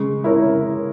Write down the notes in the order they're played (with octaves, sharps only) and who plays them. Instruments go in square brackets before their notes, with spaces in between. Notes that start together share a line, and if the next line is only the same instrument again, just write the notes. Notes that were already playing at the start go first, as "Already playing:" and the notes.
Already playing: [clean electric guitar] C#3 [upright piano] G#3
[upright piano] E4 A#4 C#5